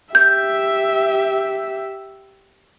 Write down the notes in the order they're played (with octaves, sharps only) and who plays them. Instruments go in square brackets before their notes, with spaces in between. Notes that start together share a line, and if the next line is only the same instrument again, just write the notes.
[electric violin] G4 E5 [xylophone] G6